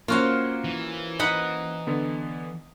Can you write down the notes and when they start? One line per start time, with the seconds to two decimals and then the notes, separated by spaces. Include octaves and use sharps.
0.08 A#3 C#4 F4 F#4 C5 F5
0.64 E3
1.19 D#4 F#5 B5
1.87 D3 B3